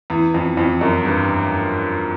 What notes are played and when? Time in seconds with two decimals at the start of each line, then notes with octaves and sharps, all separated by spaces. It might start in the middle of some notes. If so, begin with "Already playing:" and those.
0.10 E2
0.34 F2
0.57 F2
0.81 F#2
1.05 G2